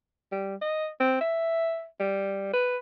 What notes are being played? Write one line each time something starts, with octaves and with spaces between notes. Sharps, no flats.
G3
D#5
C4
E5
G3
B4